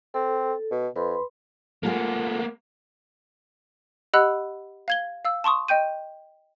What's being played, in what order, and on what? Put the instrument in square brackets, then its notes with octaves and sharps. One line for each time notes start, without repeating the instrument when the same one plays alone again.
[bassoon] C4 [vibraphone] A4
[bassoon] B2
[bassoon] F2 [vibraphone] B4 B5 C6
[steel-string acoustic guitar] G#3 F4 A4 [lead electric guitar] A#3 B3
[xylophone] G4 D#5 F#5 B5 E6 F#6
F5 G#6 G7
F5 E6
A5 C6 C#6 D#6
D#5 G5 G6 D#7